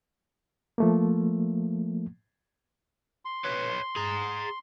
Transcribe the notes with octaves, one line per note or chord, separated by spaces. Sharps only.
F3 A3 A#3
C6
B4 C#5
G#4 A#5